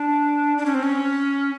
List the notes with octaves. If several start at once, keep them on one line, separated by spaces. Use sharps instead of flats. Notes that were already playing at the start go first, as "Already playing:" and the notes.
Already playing: D4
D4
C#4
C4
C#4